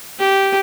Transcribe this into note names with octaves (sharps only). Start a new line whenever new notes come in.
G4